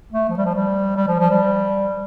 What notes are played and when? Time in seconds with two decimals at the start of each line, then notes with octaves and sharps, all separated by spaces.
0.12 A3
0.29 F3
0.37 G3
0.46 F3
0.54 G3
0.96 G3
1.07 F3
1.19 F3
1.30 G3